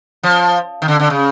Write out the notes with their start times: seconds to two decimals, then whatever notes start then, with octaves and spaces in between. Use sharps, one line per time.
0.23 F3
0.82 D#3
0.88 D3
1.00 D3
1.10 C#3